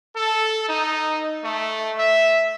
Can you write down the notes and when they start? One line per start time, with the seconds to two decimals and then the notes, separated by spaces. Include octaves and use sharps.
0.17 A4
0.69 D#4
1.44 A3
1.98 E5